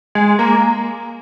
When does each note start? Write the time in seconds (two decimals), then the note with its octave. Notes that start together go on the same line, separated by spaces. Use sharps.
0.15 G#3
0.39 A#3